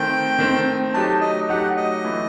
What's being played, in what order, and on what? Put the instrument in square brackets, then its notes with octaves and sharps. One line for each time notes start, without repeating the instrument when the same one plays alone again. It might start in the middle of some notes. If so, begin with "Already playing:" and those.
Already playing: [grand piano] D#3 A3 C4 [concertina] G5
[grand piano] D#3 A3 C4
[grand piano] F#3 A3 D#4 G4 [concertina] A5
[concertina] D#5
[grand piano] F#3 A3 D#4 G4 [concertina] F#5
[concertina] D#5
[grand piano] E3 A3 E4